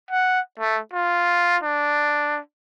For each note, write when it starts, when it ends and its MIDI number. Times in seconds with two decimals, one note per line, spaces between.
0.11 0.40 78
0.59 0.80 57
0.93 1.57 65
1.63 2.40 62